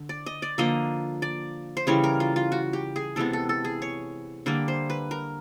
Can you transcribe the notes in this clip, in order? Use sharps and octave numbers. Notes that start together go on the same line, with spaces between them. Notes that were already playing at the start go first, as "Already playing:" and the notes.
Already playing: D3
D5
D#5
D5
D3 F3 A#3 D#5
D5
C5
C#3 E3 G3 C#5
A#4
F4
F4
F#4
G4
G#4
C3 E3 G#3 B3 A4
A4
A4
G#4
C#5
D3 G3 A#3 D5
C5
B4
A#4